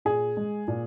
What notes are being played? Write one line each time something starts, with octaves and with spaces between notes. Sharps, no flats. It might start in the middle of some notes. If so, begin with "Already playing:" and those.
A#2 G#4
G#3
A#2